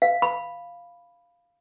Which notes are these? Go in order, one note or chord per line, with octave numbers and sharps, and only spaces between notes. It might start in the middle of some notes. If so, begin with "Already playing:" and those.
F5
B5